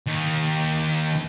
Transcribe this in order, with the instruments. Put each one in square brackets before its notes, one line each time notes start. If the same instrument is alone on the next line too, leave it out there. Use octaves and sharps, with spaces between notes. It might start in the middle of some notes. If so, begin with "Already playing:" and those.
[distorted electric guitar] D#2 D#3